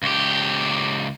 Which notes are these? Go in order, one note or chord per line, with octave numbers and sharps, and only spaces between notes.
C#2 G4